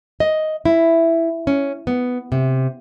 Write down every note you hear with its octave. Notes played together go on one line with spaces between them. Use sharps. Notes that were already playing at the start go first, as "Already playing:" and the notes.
D#5
E4
C#4
B3
C3